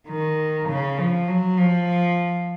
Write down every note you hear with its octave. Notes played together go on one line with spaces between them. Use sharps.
D#3
C#3
F3
F#3
F3